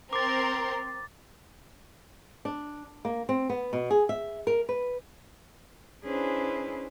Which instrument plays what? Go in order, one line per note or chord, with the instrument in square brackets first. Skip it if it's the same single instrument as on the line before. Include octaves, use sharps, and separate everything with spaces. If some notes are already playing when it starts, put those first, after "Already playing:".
[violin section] C4 A#4 C6 [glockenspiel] D6 A6
[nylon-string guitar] D4
A#3
C4
B3
B2
G#4
E5
A#4
B4
[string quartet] C#4 D4 E4 G#4 B4 C5